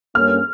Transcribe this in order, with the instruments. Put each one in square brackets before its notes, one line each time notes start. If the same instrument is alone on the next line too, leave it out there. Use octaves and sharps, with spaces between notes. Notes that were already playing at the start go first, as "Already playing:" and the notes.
[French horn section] G2 G3 A#3 C#4 [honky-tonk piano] F6